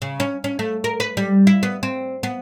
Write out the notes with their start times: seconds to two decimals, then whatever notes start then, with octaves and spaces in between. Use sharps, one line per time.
0.02 C#3
0.20 C#4
0.44 C#4
0.59 A3
0.84 A#4
1.00 B4
1.17 G3
1.47 E4
1.63 B3
1.83 C4
2.23 B3